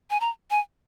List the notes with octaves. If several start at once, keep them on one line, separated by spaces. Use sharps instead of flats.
G#5
A#5
G#5